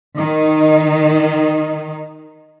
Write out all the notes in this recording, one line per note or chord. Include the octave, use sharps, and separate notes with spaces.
D#3 D#4